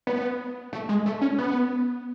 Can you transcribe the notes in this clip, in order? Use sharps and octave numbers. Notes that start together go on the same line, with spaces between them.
B3
A3
G#3
A3
C#4
B3